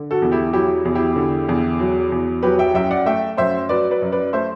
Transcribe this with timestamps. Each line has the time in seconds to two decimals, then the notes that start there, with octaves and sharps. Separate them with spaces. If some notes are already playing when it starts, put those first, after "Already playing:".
Already playing: D3
0.11 F#4 A4
0.22 E2
0.32 E4 G4
0.53 F#3 E4 G4
0.85 E2
0.95 E4 G4
1.16 D3
1.49 E2
1.80 F#3
2.12 E2
2.43 F#3 G4 B4
2.59 E5 G5
2.74 F#2 E5 G5
2.91 D5 F#5
3.06 A3 E5 G5
3.38 F#2 C5 E5
3.69 F#3 B4 D5
3.91 B4 D5
4.02 F#2
4.12 B4 D5
4.33 A3 C5 E5